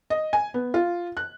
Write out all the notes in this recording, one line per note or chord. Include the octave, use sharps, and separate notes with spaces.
D#5
G#5
B3
F4
F#6